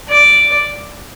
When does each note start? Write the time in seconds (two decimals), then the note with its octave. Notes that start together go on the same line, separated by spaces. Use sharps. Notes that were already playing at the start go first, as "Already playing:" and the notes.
0.09 D5